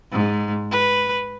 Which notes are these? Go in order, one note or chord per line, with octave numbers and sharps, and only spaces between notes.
G#2
B4